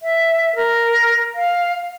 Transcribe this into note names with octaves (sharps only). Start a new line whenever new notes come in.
E5
A#4
F5